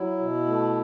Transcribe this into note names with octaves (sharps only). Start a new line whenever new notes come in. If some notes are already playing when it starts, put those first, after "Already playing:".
Already playing: F#3 E4
B2
A3